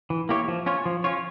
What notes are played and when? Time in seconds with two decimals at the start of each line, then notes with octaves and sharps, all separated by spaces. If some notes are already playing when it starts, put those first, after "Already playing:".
0.10 E3
0.29 A#3 E4 G4 C#5
0.48 F3
0.66 C#4 F4 C#5
0.86 F3
1.04 C#4 F4 C#5